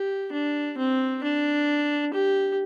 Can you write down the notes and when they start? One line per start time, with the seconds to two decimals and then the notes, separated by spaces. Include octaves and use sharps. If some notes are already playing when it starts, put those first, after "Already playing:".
Already playing: G4
0.33 D4
0.78 C4
1.23 D4
2.14 G4